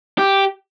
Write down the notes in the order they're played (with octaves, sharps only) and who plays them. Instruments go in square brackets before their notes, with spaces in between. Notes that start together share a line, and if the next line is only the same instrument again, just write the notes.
[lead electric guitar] G4